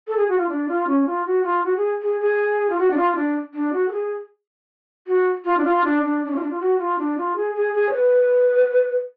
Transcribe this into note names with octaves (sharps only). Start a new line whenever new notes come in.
A4
G#4
F#4
F4
D4
F4
C#4
F4
F#4
F4
F#4
G#4
G#4
G#4
F4
F#4
D4
F4
D4
D4
F#4
A4
G#4
F#4
F4
D4
F4
D4
D4
D4
C#4
F4
D4
F4
F#4
F4
D4
F4
G#4
G#4
G#4
C#5
B4